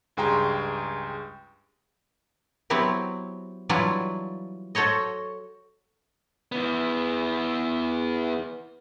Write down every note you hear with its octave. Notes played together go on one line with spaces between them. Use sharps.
C#2 G2 G#4 G5 A#5 C6
F#3 B3 C4 E4 G4
E3 F#3 G3 D4 E4 F4
F#4 A4 C5 C#5 D#5
E3 B3